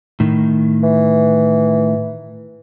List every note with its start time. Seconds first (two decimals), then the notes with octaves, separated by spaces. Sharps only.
0.20 A2 D#3
0.83 E3